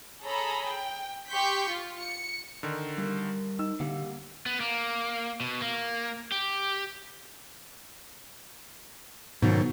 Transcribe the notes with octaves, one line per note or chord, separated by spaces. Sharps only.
G#4 A4 C#5 A#5 B5
G5
G4 C6 C#6 G6 B6
F4
C#7
D3 D#3
G3 A#4
D#4 E6
D3 A#3 G4 F#5
B3
A#3
B2
A#3
G4
G#2 B2 D#3 F#3